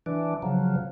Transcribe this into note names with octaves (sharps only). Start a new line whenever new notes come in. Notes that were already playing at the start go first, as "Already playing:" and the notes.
E3 D4
C#3 F3 F#3